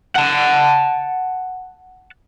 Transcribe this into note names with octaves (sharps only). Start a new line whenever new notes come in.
F#5 A5